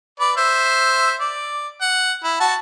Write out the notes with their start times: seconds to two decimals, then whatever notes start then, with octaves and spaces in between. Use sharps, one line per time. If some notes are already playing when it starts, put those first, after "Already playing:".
0.20 B4 D5
0.37 C5 E5
1.21 D5
1.81 F#5
2.24 E4
2.40 F#4 A5